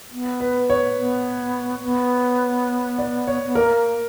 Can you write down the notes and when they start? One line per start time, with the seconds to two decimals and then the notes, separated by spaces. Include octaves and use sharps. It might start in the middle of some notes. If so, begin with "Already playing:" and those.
0.12 B3
0.40 B4
0.70 C#5
0.98 B3
1.84 B3
2.98 D5
3.27 C#5
3.46 B3
3.55 A#3 A#4